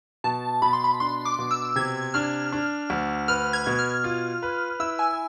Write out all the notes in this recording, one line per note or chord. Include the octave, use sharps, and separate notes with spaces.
B2 A5
B2 B5
C6
B5
D4 C6
D6
B2
E6
C3 G#6
D4 F6
D4
D2
B4 F6
G#6
B2
F6
F4
B4
E4 E6
G#5